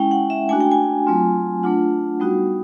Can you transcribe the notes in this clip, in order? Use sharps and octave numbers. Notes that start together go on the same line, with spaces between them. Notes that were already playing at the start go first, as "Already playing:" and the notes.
Already playing: G#3 C#4 E4 G5
F#5
E5
A3 D4 F#4 G#5
G5
G#5
F#3 A3 C4 F4
A3 D4 F4 F#5
G3 B3 D#4 F#4